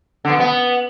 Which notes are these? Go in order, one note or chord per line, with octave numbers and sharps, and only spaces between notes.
D3
B3
B2
B3